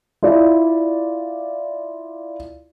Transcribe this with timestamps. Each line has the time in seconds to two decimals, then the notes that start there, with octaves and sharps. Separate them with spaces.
0.23 E4 F4 D5